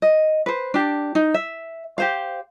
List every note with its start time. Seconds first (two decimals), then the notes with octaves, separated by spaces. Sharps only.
0.02 D#5
0.46 B4 C5
0.74 D4 G4
1.15 D#4
1.34 E5
1.98 G4 C5 F5